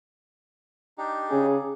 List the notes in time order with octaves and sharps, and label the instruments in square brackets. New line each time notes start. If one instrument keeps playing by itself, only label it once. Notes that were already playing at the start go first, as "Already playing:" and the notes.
[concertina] D4 D#4 G4
[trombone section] C#3 C#4 G#4